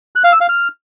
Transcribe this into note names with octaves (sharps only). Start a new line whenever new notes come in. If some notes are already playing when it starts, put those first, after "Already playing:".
F#6
F5
E6
F5
F6